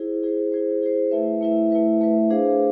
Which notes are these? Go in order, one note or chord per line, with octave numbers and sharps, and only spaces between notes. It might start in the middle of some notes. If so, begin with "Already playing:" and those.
Already playing: E4 G#4 C5
E4 G#4 C5
E4 G#4 C5
E4 G#4 C5
A3 E4 B4 E5
A3 E4 B4 E5
A3 E4 B4 E5
A3 E4 B4 E5
D4 G#4 C5 F5